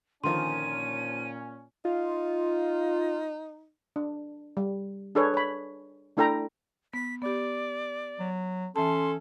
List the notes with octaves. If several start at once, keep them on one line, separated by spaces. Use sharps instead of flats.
A#2 D3 D#3 F3 C#4 C6 D#7
D#4 F4
D4
G3
D4 G#4 A4 B4 C#5
C#5 B5
A3 D4 E4 A4 G5 A#5
B3 B6
B3 G4 D5
F#3
E3 C#4 A4 A5 C6